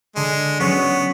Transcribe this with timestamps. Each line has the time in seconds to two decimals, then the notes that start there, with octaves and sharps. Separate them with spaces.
0.16 D3 G#3
0.60 F#3 B3 C#4 G#4 C#5